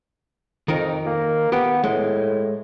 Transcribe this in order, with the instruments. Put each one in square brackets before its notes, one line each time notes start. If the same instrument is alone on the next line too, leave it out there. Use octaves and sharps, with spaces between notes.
[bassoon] F2 [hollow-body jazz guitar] D#3 D#4 A#4
[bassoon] A#3
[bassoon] B3 [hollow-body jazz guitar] G4
[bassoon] A2 [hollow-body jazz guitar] G#3